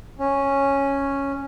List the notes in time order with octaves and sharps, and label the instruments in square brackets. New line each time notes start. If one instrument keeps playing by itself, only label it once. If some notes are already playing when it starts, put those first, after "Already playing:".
[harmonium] C#4